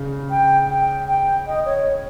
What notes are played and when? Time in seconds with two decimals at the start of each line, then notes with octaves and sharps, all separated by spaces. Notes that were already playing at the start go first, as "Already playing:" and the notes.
Already playing: C#3
0.30 G5
0.69 G5
1.08 G5
1.47 D#5
1.66 C#5